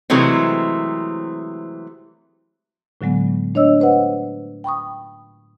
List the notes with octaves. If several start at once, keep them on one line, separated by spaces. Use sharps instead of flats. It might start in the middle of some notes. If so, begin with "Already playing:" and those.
C3 E3 F#3 G#3 A3 C4
A2 D3 F#3 G#3 B3
A3 D4 C#5 D#5 E6
B4 C5 D#5 F#5
G5 B5 C#6 D#6